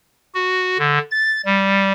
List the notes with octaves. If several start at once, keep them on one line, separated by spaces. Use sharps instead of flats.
F#4
D3
A6
G3